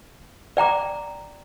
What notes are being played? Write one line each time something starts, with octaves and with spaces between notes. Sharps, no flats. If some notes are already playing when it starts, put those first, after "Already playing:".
D5 G5 A#5 D6